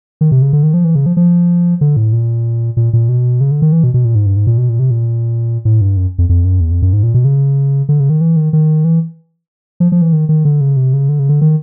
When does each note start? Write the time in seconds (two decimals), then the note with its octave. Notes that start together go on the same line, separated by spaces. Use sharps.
0.21 D#3
0.32 C3
0.42 C#3
0.53 D3
0.63 D#3
0.74 F3
0.84 E3
0.95 C#3
1.06 F3
1.17 F3
1.81 D3
1.97 A2
2.13 A#2
2.77 A#2
2.93 A#2
3.09 B2
3.41 C#3
3.51 D3
3.62 D#3
3.72 E3
3.84 B2
3.94 B2
4.05 A#2
4.15 G#2
4.26 G2
4.36 G#2
4.47 A#2
4.58 B2
4.69 A#2
4.79 C3
4.91 A#2
5.65 A2
5.81 G2
5.97 F#2
6.18 F2
6.29 F2
6.45 F#2
6.61 E2
6.72 F2
6.82 F#2
6.93 G#2
7.03 A#2
7.14 B2
7.25 C#3
7.89 D3
8.00 C#3
8.10 D#3
8.21 E3
8.36 D#3
8.53 D#3
8.85 E3
9.80 F3
9.92 F3
10.02 E3
10.13 D#3
10.29 D#3
10.45 D3
10.61 C#3
10.77 C3
10.93 C#3
11.09 D3
11.19 C#3
11.29 D3
11.41 D#3